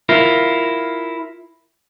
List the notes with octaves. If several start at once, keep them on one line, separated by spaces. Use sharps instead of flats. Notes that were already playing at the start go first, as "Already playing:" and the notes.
E4 F4 A#4